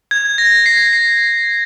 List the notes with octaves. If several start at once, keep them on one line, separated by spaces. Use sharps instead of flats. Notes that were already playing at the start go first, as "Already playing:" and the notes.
G#6
A#6
C7
C7